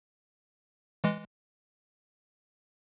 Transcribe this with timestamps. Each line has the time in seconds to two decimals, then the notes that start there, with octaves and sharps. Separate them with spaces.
1.04 E3 G#3